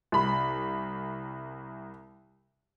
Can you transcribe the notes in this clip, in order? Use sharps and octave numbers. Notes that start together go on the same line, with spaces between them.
C2 B5